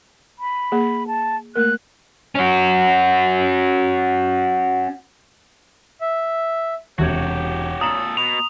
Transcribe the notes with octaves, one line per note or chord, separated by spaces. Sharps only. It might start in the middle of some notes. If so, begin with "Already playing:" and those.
B5
A#3 G#4
A5
A3 A#3 A#4 F#6
C#4 F#4
E5
E1 C3 F#4 G4 C#5 G#6
A#2 A4 A#5 D#6 E7 F#7
B2 F7